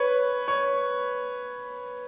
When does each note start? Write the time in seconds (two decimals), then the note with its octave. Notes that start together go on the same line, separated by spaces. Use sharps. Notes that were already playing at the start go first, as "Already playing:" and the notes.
Already playing: B4 C#5
0.48 C#5